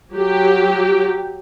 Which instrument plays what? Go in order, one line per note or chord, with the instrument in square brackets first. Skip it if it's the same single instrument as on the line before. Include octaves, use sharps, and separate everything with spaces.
[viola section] F#3 G4